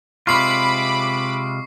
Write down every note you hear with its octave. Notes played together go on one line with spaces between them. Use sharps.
C3 G#3 F4 B5 C#6 D6 C7